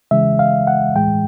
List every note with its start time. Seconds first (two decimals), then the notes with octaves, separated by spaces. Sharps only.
0.11 C#3 E3 G#3 E5
0.39 F5
0.67 F#5
0.95 A2 E3 G#3 G5